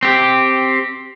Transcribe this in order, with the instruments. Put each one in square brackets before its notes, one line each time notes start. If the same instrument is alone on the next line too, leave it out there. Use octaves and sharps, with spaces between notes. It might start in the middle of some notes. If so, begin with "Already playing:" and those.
[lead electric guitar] C4 G4